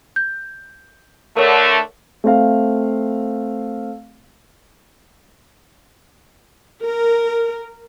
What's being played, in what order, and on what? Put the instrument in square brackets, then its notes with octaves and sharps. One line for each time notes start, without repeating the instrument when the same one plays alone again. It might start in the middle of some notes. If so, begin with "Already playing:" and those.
[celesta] G6
[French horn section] D3 A3 [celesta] A#4 C#5
[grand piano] A3 C4 F5
[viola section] A#4